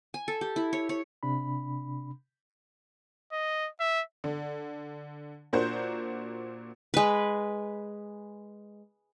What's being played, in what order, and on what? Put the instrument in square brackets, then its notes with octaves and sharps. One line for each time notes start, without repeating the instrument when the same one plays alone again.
[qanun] G#5
A4
G4
E4
C#5
C#5
[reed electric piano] C3 D4 B5
[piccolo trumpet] D#5
E5
[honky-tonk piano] D3
A#2 A#3 D4 F#4 C5 G6
[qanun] G#3 B4